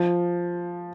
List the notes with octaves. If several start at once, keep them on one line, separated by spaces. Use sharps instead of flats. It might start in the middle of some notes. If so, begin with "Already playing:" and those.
Already playing: F3